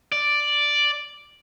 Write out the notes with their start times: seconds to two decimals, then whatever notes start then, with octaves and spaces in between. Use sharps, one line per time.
0.12 D5